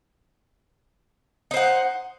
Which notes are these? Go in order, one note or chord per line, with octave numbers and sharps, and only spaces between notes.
D#4 C5 F#5